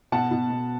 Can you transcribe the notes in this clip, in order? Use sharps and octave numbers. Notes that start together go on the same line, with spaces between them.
B2 F#5 A5
B2
B2